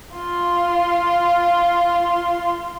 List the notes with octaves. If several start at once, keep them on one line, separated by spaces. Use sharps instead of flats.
F4 C6